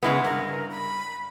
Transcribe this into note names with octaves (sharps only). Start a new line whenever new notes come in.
C#3 G#3 B3 E4
G2 A#4
B5